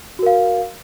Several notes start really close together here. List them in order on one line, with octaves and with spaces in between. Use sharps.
F#4 A#4 F5